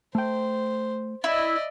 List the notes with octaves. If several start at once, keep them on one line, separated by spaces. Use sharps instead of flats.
A3 C5 G5
E4 D5 D#5